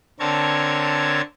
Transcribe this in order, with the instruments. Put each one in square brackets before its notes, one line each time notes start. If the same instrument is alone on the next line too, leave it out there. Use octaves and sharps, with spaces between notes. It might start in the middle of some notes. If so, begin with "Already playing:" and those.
[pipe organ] D3 C4 A#4 C#5 A5 G#6